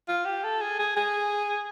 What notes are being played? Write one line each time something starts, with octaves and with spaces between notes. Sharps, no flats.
F4
G4
A4
G#4
G#4
G#4